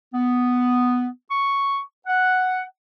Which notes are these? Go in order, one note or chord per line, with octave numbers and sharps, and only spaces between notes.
B3
C#6
F#5